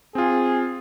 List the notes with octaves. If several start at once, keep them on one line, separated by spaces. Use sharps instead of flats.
C4 F4 G#4